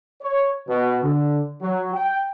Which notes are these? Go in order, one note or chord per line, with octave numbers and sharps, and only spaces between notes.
C#5
B2
D3
F#3
G5